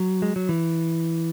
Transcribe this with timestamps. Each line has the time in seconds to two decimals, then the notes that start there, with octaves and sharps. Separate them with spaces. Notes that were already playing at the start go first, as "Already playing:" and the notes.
Already playing: F#3
0.22 G#3
0.36 F#3
0.49 E3